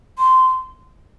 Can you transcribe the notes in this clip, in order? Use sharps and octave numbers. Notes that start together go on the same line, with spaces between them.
C6